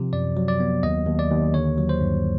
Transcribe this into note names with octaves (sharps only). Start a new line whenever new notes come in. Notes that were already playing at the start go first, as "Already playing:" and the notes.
Already playing: C3 F3
F#2 D5
F#3
D5
B3
D#2 D#5
D#2
D5
D#2
D3 C#5
F#3
C5
G2